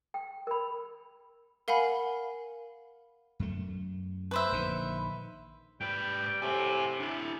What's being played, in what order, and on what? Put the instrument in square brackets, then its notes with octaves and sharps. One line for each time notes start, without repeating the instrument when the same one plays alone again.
[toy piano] G5
A#4 B5
[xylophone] A#4 F5 F#5 G#5 B5
[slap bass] F#2 A3
[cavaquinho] B4 C5 E5
[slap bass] A#1 D3 D#3
[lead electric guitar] G#2 B4 [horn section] G3 G5
[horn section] A2 C3 [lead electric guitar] F#5 G#5
[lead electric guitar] D4 E4